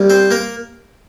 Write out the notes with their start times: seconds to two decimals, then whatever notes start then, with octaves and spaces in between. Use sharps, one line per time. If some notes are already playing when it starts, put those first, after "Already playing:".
Already playing: C2 C3 G3 A#3
0.10 C4 C5
0.31 A#3 A#4